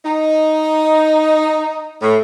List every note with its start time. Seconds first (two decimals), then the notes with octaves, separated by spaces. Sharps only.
0.05 D#4
2.02 A2